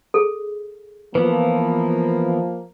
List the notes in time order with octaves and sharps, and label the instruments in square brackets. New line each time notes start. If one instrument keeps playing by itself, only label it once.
[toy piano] G#4 A4
[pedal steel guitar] E3 B3 [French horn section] F3 A#3 [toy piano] B4